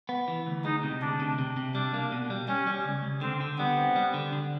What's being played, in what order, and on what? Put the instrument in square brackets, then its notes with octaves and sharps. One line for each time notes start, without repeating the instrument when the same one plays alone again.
[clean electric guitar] B3
E3
D2
[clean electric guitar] G#3 [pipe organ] D#4
[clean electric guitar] C3
[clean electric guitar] D2 [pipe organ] D4
[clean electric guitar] C3
C3
C3
[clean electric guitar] G3 [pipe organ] D4
[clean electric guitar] A#3
B2
G3
[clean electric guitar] G3 [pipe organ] C#4
[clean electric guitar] G3
C#2
C#2
[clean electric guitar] D3 [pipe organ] C4
[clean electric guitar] D3
[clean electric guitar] G3 [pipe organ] B3
[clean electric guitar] C4
G3
D3
D3